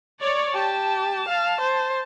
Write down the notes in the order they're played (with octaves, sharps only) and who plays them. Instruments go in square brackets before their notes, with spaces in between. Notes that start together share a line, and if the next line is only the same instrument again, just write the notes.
[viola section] C#5 D5
[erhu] G4 [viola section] A5
[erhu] F5
C5